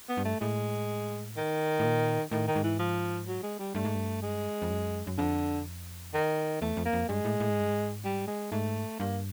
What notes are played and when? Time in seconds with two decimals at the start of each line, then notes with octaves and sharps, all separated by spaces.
0.09 B3
0.17 G2
0.25 A3
0.41 A2 G#3
1.37 D#3
1.79 A2
1.85 A#2
2.31 A2 D#3
2.47 D#3
2.55 G#2
2.63 E3
2.79 F3
3.28 F#3
3.43 G#3
3.59 G3
3.75 G2 A3
3.85 G#2
3.95 G2
4.22 G#3
4.62 F2
4.70 F#2
5.07 F#2
5.18 F2 D3
6.14 D#3
6.61 E2 A3
6.77 F2
6.85 A#3
6.93 F2
7.08 G2 G#3
7.25 A2
7.40 A2
7.50 G#2
7.60 G2
7.69 G#2
8.04 G3
8.27 G#3
8.51 G#2 A3
8.99 G2 A#3